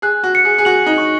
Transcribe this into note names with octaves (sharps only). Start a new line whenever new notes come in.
G#4 F#6
F#4
C#7
G#4
G#4
F#4 F#7
D#4
C#6